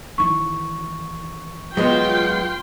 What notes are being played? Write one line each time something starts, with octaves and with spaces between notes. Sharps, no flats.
D#3 E3 C#6
F#3 G#3 B3 F4 G5 C6